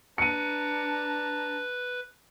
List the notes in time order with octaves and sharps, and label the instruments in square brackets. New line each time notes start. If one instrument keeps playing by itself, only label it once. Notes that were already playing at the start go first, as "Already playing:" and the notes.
[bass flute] D4 [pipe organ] B4 [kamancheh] A5 A#5 [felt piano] C#7 D#7